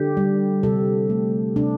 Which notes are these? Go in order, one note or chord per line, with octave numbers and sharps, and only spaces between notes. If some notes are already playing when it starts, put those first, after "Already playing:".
Already playing: D3 G4
G3
C3 A4
A3
C3 D4